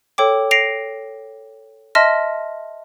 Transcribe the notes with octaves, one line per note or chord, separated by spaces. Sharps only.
A4 C#5 G5 D6
A#6 C7 D7 F7
D#5 E5 A5 C6 F6 A#6